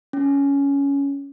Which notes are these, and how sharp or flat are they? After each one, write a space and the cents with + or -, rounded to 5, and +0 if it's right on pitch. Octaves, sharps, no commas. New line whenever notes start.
C#4 +15